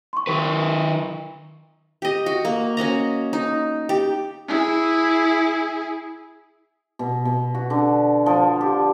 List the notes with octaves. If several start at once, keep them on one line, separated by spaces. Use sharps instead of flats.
C6 C#6
D#3 B4
G4 D#5
F#4
A#3
C#4 F#4 D#5 A#5
D#4
G4
E4 G#4
B2
B2
F#4
D3
F3
G4